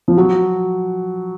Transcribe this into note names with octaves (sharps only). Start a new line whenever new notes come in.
F3
F#3